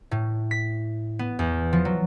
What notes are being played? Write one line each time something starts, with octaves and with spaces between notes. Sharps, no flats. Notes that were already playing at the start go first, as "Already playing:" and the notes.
A2
B6
B3
E2
F3
F#3